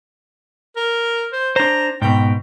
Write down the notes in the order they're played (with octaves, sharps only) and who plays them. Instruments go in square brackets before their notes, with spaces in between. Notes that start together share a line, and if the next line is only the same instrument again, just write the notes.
[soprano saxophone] A#4
C5
[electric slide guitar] D4 C5 [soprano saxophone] A#5
[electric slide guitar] G#2 B2 [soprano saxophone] G5